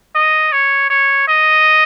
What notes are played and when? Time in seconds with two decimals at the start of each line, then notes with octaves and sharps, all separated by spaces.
0.15 D#5
0.52 C#5
0.90 C#5
1.28 D#5